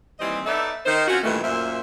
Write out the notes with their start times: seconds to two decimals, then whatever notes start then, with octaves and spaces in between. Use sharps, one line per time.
0.20 D#2 E3 G3 C4 C5 D#5
0.46 B3 D#4 A4 D5 E5
0.86 D#3 D#4 C5
1.08 C4 C#4 F4 F#4
1.24 G2 A#2 D#3 E3 A3
1.44 F#2 A#2 A#3 C5 E5